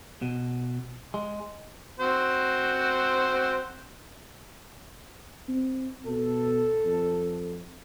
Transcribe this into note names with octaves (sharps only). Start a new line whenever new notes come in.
B2
G#3
C4 F#4 C5
C4
B2 A4
F2